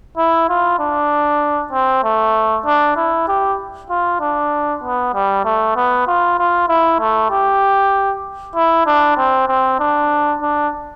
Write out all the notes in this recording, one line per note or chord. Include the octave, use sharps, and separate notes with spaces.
E4
F4
D4
C4
A3
D4
E4
G4
F4
D4
B3
G3
A3
B3
F4
F4
E4
A3
G4
E4
D4
C4
C4
D4
D4